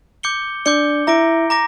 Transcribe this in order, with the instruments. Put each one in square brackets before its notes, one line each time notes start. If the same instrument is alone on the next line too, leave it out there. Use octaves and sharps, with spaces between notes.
[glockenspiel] D6 G6 C#7 G7
[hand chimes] D4 D5 [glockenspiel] D6 G6 C#7 G7
[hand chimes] E4 E5 [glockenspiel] A#5 D6 A#6 D7
[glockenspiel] A#5 D6 A#6